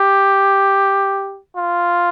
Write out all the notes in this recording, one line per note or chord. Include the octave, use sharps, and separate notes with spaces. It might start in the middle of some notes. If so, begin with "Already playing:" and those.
Already playing: G4
F4